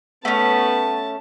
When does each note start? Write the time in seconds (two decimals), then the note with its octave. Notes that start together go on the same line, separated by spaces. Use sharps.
0.25 A3 B3 C#4 A5